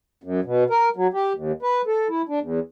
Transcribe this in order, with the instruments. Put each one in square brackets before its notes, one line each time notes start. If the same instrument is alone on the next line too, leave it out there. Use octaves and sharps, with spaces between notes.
[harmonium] F#2
B2
A#4
F#3
G4
D#2
B4
A4
E4
D4
E2